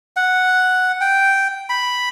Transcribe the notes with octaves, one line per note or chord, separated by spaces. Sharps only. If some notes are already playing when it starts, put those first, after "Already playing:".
F#5
G5
B5